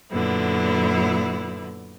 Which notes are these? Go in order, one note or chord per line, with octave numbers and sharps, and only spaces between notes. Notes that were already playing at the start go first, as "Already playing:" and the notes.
F#2 A#2 D3 B3 E4